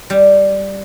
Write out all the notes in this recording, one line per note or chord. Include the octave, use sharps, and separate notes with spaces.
G3